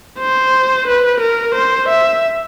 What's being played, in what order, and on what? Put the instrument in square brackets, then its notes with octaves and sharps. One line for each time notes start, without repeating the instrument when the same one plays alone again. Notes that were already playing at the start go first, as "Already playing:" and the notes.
[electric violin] C5
B4
A#4
C5
E5